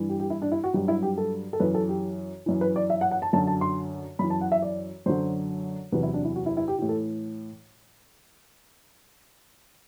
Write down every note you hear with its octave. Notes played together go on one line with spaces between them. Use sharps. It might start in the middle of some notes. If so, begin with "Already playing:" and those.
Already playing: G2 E3
G4
G4
E4
D4
E4
F#4
G2 F#3 G4
E4
G4
A4
A4
F#2 E3 B4
A4
G4
F#2 E3
B4
D5
E5
F#5
F#5
A5
F#2 D3 F#3 A5
A5
C6
F#2 E3 B5
A5
F#5
E5
D5
F#2 D3 F#3 C5
E2 C3 F#3 B4
E4
D4
E4
F#4
E4
E4
G4
A2 E3 G4
A4